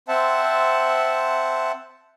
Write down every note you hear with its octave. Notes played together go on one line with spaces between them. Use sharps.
C4 C5 E5 F#5 A5